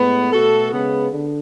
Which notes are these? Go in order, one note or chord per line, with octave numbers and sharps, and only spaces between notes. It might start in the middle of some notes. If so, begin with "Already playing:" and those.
Already playing: A2 G#3 B3
B2 A3 F#4 A4
C#3 G#3 B3
D3